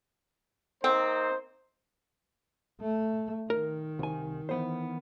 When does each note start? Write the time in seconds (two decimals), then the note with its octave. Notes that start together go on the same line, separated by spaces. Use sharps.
0.84 A#3 C4 D#4 C5
2.81 A3
3.50 D#3 A#4
3.99 C2 G#5
4.49 E3 B3 C5